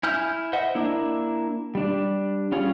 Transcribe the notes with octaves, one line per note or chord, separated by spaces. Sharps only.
E4 G#5 F6 G6
C5 D#5 E5 F#5
A#3 D4 E4
G3 D4
G3 C#4 F4 G#4